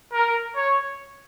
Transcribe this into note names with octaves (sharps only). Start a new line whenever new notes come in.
A#4
C#5